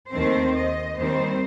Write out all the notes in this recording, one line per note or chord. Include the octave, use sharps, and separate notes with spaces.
D#2 D#3 A3 C4 C5
D#5
D#2 D#3 G3 C4 C5